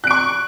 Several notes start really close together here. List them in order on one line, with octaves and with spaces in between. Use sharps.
F#6 D7 C#6